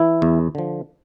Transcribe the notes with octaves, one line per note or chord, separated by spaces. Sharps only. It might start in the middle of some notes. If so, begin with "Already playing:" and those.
Already playing: E3 E4
E2
D3 F3